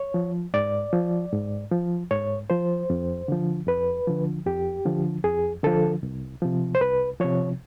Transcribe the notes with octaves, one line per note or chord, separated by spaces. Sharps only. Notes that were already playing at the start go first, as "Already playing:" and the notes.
Already playing: C#5
F3
G#2 D5
F3
G#2
F3
G#2 C#5
F3 C5
F2
D3 F3
F2 B4
D3 F3
F2 G4
D3 F3
F2 G#4
D3 F3 A4
C2
C3 F3
C5
C2 B4
C3 F3 C#5